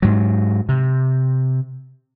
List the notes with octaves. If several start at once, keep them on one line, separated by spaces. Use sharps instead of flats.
G#2 F#3
C3